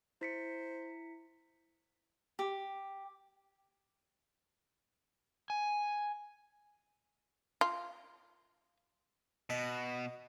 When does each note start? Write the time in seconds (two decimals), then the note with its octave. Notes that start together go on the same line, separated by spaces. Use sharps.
0.21 E4 C5 B6 C#7
2.39 G4
5.50 G#5
7.61 F4
9.50 B2 D#5